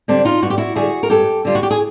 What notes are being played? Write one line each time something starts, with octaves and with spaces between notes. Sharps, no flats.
D3 G3 C4 D4
D#4 F4
G2 F#4
G4
E4 F#4
D3 G3 F#4 G#4
A#4
G2 G4 A4
D3 G3 F4
F#4
G4
G#4